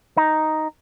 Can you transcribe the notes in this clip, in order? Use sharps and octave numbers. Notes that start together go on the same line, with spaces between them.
D#4